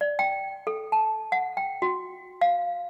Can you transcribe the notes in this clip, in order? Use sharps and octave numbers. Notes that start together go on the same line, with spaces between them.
D5
G5
A4
A5
F#5
G5
F#4
F5